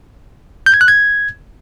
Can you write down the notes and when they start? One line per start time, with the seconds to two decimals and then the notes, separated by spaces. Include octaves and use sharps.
0.66 G6
0.74 G#6
0.81 F#6
0.88 G#6